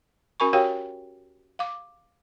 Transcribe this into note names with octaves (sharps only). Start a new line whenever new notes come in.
C#4 F#4 A#4 G#5 B5 C#6
F#4 G4 A#4 C#5 F5 G5
F5 D6